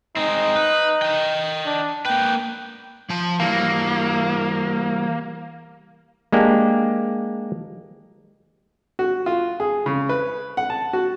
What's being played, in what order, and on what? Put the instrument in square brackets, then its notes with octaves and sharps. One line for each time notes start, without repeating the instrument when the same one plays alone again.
[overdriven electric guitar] G#3 C4 [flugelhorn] D#4
[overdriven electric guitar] B4
D#5 G5
[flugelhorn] D4
[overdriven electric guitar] A#3 B4 [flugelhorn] G5
[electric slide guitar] F3 A5
[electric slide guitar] E3 G3 [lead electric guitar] A#3
[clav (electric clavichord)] G#3 A#3 D4 G4
[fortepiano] F#4
F4
G#4
C#3
B4
F#5
A5
F#4